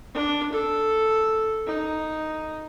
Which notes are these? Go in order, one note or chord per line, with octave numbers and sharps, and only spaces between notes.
D4
A4
D#4